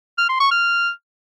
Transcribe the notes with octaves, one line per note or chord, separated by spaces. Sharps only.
F6
C6
C#6
F6